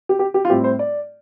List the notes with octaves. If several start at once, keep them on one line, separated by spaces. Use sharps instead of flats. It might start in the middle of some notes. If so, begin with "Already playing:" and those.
G4
G4
G4
F4
A2 G3 C4 G4
C5
D5